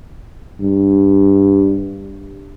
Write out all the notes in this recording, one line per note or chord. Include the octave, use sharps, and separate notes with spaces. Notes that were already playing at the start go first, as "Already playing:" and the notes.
G2